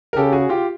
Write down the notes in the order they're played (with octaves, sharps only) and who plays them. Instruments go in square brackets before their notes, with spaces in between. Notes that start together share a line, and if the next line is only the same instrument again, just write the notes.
[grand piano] A#4
[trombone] C#3 [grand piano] G4 A4
[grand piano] F#4 G#4
F4 G4